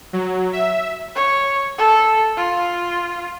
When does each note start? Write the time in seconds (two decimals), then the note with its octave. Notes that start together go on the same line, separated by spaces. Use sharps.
0.13 F#3
0.53 E5
1.15 C#5
1.78 A4
2.37 F4